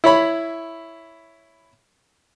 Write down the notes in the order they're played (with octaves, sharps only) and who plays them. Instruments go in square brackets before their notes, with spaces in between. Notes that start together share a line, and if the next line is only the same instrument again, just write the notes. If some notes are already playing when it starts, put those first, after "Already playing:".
[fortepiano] E4 C#5 B5